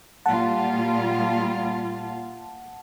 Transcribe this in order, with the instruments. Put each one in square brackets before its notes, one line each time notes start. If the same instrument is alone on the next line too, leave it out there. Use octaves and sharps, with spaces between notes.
[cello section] A#2 G3 F4 [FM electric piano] F#5 A5